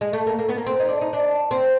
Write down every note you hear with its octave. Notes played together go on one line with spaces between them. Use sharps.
G#3
A3
A#3
A#3
B3
A#3
C4
D#4
D4
D#4
D4
C4